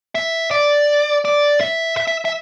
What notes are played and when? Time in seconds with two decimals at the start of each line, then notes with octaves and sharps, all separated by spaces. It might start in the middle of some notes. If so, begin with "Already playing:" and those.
0.15 E5
0.51 D5
1.25 D5
1.61 E5
1.97 E5
2.07 E5
2.25 E5